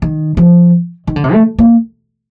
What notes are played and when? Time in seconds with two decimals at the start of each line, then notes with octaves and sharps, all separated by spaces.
0.02 D#3
0.37 F3
1.07 D#3
1.16 D3
1.24 C3
1.33 A3
1.58 A#3